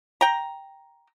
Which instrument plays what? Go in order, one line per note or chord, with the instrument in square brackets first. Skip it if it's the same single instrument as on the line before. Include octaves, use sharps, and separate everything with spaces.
[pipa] G5 A#5